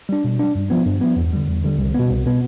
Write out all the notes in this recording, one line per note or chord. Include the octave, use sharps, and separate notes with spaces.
G3 D4
B2
G3 D4
G2
F3 B3
G2
F3 B3
E2
D3 G3
E2
D3 G3
C2
B2 B3
C2
B2 B3